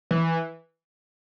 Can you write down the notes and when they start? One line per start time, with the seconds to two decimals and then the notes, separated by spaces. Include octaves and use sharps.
0.11 E3